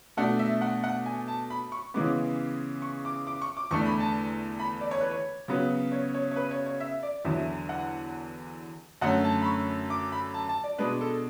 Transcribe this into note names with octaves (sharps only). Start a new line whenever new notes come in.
B2 A3 D4 F#5
E5
F#5
F#5
G#5
A5
B5
C#6
C#3 E3 G#3 B3 D6
C#6
D6
D6
C#6
D6
E2 D3 A3 D4 C#6
B5
A5
B5
D5
C#5
B4
C#5
C#3 F#3 B3
C#5
C#5
C#5
B4
C#5
C#5
E5
D5
E2 D3 F#3 E5
F#5
F#2 D3 A3 C#4 F#5
A5
B5
C#6
D6
B5
A5
A5
D5
B2 G#3 D4 B4
A4